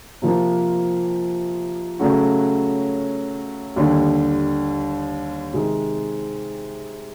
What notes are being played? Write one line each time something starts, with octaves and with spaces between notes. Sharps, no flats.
C3 F3 A#3
C#3 F#3 A3 C#4 F#4
D#2 D3 G3
C3 D#3 G#3